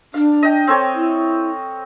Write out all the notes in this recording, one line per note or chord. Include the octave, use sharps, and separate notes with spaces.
D4 F5
D#5 G5
C4 A4 C#5
E4